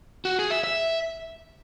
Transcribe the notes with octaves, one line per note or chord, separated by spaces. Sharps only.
F#4
G#4
E5
E5